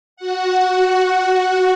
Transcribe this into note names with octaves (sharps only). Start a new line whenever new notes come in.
F#4 F#5